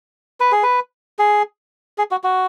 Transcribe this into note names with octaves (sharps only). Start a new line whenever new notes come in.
B4
G#4
B4
G#4
G#4
F#4
F#4